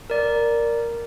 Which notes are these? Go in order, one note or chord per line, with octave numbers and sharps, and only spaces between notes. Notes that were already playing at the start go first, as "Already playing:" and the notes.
A#4 D5